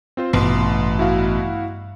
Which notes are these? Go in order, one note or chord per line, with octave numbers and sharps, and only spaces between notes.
C4 F4 C5
A1 G2 B2 C6 C7
E4 F#4 F5